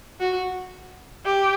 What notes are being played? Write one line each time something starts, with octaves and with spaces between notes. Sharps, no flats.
F#4
G4